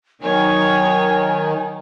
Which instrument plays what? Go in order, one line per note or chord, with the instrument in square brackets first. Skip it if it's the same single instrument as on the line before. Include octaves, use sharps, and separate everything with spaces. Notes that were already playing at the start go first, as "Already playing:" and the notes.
[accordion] D#3 [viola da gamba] F#3 D#4 C#5 [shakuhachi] G#5